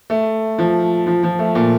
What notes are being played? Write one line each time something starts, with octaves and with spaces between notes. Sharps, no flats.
A3
F3
F3
F3
A3
A#2